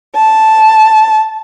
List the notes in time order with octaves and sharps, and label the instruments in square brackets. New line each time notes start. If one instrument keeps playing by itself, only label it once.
[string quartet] A5